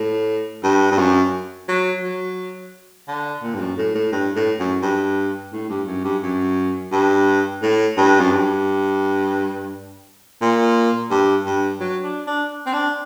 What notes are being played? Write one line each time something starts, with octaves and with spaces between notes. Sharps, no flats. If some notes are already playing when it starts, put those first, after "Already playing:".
Already playing: A2
G2
G2
F#2
F#3
F#3
D3
A#2
G2
F#2
A2
A2
G2
A2
F#2
G2
A2
G2
F#2
G2
F#2
G2
A2
G2
F#2
G2
A#2
G2
G2
F#3
D4
D4
C4
D4